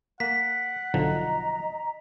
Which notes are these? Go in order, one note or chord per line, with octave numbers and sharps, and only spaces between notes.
A#3 F#5 B6
B1 D3 F3 D#5 A#5